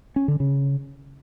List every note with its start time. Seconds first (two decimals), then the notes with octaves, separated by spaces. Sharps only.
0.16 C#4
0.28 D3
0.40 C#3